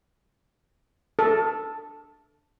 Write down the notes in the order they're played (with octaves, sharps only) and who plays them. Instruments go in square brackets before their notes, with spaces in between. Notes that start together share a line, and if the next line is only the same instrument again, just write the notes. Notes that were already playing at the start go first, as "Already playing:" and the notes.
[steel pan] A4